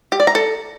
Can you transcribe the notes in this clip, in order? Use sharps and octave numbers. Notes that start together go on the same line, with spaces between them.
G4
D5
A#5
A4